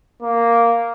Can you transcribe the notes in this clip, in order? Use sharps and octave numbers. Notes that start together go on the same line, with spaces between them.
A#3